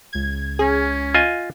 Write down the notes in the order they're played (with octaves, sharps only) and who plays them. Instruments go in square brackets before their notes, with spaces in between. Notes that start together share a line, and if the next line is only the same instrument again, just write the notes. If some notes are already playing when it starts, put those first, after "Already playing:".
[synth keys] C#2 G#6
[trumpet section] C#4 [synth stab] G#4
[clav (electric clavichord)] F4 D#5 G#5